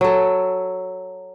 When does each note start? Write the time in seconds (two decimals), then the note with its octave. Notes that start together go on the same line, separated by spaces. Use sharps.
0.01 F#3 A4